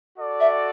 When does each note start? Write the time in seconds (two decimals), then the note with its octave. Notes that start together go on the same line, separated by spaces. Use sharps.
0.19 F#4 A4 D5
0.40 E5